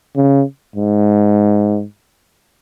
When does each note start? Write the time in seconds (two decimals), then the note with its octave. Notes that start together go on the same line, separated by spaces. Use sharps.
0.16 C#3
0.76 G#2